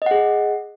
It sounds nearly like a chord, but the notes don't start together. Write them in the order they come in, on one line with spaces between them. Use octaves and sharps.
D#5 F#5 G#4